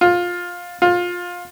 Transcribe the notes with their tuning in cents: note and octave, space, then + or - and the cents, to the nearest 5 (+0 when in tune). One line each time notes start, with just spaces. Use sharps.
F4 +15
F4 +20